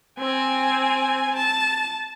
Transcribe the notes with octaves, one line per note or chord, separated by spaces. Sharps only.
C4 G#5
A5